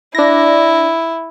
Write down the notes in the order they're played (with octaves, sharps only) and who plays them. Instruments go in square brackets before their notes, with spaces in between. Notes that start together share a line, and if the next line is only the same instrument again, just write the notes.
[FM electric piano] D4 A#6 [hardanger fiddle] E4